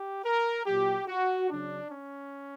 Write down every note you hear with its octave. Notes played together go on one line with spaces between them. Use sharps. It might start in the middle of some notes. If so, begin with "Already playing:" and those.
Already playing: G4
A#4
A#2 F#3 G4
F#4
C#3 F#3 D4
C#4